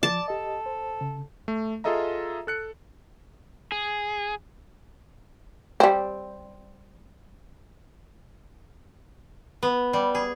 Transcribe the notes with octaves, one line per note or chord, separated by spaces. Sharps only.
F3 D5 A5
G4 A4 D#5
C5
C#3
A3
F4 G#4 A4 D#5 E5 A#5
A4 F#6 C#7
G#4
G3 C4
B3
G3
G#4